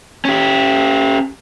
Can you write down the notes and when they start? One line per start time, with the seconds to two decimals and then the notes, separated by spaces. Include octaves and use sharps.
0.25 C#4 G4